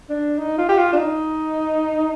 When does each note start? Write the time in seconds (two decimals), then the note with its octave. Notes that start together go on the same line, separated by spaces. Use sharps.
0.10 D4
0.38 D#4
0.58 F4
0.69 G4
0.78 F4
0.93 D4
0.98 D#4